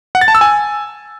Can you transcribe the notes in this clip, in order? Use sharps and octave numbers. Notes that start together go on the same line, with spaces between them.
F#5
A6
A5
E6
G#5